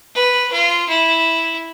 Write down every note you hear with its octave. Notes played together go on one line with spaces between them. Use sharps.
B4
F4
E4